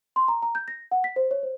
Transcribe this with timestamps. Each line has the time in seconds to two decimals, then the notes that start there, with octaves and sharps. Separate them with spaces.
0.16 C6
0.28 A#5
0.43 A#5
0.55 G6
0.68 A#6
0.91 F#5
1.04 B6
1.16 C5
1.31 C#5
1.43 C5